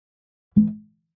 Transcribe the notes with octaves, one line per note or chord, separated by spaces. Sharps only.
E3